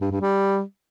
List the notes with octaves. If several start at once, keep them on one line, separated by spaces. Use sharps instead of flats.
G2
G2
G3